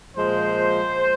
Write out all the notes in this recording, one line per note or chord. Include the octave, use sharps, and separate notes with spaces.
A#2 F3 G#3 C5